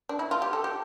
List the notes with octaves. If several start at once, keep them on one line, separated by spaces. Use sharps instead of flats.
D4
E4
F4
G4
A4
G4